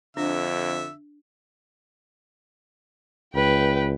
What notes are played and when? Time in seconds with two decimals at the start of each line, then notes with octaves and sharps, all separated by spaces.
0.17 F2 D3 D4 E5
3.34 C#2 B4 G5